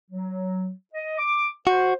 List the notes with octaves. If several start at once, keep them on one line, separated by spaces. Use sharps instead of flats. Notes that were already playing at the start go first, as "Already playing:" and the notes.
F#3
D#5
D6
F#4 C5